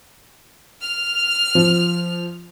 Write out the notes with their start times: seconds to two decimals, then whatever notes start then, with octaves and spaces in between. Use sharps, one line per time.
0.81 F6 F7
1.55 F3